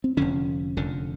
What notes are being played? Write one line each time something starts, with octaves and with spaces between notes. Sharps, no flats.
C4
F1 F2 D3 C#4
F1 F2 D3